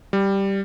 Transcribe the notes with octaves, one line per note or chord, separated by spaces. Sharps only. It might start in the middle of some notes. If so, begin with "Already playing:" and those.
G3